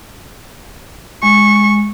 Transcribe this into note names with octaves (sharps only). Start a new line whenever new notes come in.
G#3 C#6